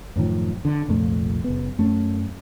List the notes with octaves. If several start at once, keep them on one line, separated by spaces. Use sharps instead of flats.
F#2 A2 D#3 F3
D3
C2 F2 A#2 A3
F#1 B3
F#2 A3 C#4